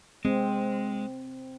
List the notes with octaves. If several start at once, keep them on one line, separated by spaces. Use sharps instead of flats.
G#3 C4